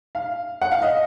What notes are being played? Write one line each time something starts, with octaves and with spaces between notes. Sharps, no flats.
F5
F#5
F5
D#5